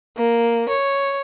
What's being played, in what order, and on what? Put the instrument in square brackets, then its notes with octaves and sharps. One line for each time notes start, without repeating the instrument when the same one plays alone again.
[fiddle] A#3
C#5